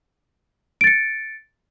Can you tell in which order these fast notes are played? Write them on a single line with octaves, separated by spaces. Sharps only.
D7 A6 C#7